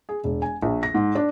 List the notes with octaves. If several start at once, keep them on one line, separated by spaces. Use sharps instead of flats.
G#4
E1
G#5
A#1
A#6
G#2
D4